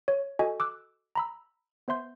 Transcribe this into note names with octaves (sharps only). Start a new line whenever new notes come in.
C#5
F#4 A4 D#5 G#5
D6 E6 F#6
A#5 B5 E6
B3 C5 E5 C6 G6